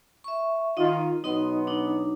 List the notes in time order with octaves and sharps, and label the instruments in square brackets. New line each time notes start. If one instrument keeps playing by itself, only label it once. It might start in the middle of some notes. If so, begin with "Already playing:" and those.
[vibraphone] E5 C#6
[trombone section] D#3 F4 [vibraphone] D#4 D#5
[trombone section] B2 F#3 B3 [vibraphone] D#4 D#5 C6
[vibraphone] D4 D#4